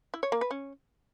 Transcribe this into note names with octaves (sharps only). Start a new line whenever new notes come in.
E4
C#5
A#3
B4
C#4